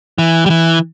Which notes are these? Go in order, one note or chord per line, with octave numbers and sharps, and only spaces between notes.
E3
G3
E3